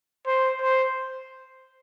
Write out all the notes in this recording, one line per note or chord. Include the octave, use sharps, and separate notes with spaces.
C5
C5